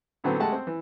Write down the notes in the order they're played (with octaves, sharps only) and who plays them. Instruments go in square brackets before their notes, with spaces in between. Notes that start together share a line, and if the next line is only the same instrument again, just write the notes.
[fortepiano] A2 D3 F#3 B3 C4
G#3 A3 G4 F#5 A5
C4
E3